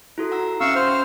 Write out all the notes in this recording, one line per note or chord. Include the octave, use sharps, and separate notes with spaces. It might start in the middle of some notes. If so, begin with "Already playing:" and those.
E4 F#4 A4
F#5 A#5 E6
C4 C#4 E5 F5 C#6 E6
C5 F6